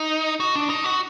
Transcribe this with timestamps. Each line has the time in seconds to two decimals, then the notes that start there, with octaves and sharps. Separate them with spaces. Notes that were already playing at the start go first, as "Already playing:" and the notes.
Already playing: D#4
0.40 F#4
0.55 D4
0.70 D#4
0.84 F#4